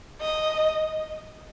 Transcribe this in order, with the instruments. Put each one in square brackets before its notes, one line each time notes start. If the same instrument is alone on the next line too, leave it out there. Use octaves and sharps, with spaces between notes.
[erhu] D#5